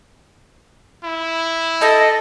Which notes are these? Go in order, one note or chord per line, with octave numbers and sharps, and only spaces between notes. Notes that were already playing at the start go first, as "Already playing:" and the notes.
E4
A4 D#5